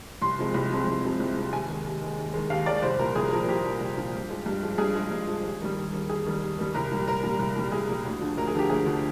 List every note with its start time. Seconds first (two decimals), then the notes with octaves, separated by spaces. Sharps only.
0.22 C2 C6
0.39 C3 F3 G#3
0.54 C2
0.71 C3 F3 G#3
0.87 C2
1.04 C3 F3 G#3
1.20 C2
1.37 C3 F3 G#3
1.53 D#2 G#5
1.68 D#3 G#3
1.84 D#2
2.01 D#3 G#3
2.18 D#2
2.33 D#3 G#3
2.50 D#2 F5
2.66 D#3 G#3 D5
2.82 C2 C5
2.99 A#2 F3 A#4
3.15 C2 G#4
3.31 A#2 F3 A#4
3.48 C2 G4
3.64 A#2 F3
3.81 C2
3.97 A#2 F3
4.14 G2
4.30 F3 G#3
4.46 G2
4.63 F3 G#3
4.78 G2 G#4
4.94 F3 G#3
5.11 G2
5.27 F3 G#3
5.43 D#2
5.61 D#3 G3
5.77 D#2
5.92 D#3 G3
6.09 D#2 G#4
6.26 D#3 G3
6.41 D#2
6.58 D#3 G3
6.74 C2 A#4
6.91 A#2 G3
7.08 C2 A#4
7.23 A#2 G3
7.39 C2
7.56 A#2 G3
7.72 C2 G#4
7.88 A#2 G3
8.05 D2
8.21 D3 F3
8.37 D2 A#4
8.48 G#4
8.55 D3 F3 G4
8.69 D2 G#4
8.86 D3 F3